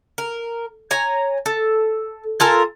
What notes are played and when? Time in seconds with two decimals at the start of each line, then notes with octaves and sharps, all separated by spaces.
0.18 A#4
0.91 C#5 G#5 A#5
1.46 A4
2.40 F4 A4 A#4 G#5